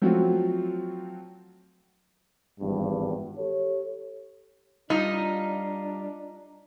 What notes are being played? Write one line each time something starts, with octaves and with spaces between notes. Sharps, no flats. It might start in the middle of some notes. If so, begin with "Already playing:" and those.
F3 F#3 A3 C4 F4 F#4
G#1 E2 G2
G4 A4 C#5
G3 D4 D#4 F4